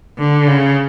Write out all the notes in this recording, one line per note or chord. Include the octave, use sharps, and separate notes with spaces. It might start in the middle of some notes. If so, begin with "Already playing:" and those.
D3
C#3